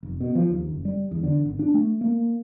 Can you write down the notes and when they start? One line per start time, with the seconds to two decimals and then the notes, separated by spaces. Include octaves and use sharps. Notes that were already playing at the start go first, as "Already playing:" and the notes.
0.03 F1
0.20 B2
0.35 F3
0.50 D#2
0.68 F#1
0.85 G3
1.11 E2
1.23 D3
1.45 G#1
1.59 D4
1.74 A3
2.01 A#3